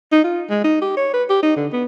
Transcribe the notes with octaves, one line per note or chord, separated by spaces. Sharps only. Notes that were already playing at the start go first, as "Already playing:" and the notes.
D#4
F4
G#3
D#4
G4
C#5
B4
G4
D#4
D3
B3